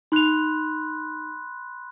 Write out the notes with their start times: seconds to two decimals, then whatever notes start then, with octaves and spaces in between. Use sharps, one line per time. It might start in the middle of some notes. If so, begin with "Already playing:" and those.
0.12 D#4 B5 C6 F#6 F7